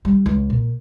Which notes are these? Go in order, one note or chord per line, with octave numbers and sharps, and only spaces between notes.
G3
C#2
A#2